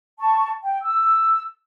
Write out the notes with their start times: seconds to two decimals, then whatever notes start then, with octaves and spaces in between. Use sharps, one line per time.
0.21 A5 C#6
0.64 G5
0.82 E6